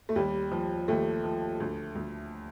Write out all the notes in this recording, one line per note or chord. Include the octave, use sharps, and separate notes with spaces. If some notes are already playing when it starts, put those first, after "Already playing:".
A3
D#2 G3
F3
D#2 A3
F3
D2
D2